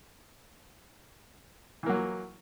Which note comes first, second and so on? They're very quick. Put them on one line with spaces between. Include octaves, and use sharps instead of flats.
E3 A#3 F#3